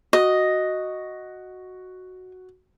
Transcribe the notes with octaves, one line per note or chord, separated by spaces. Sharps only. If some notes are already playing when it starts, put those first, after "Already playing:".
F#4 D#5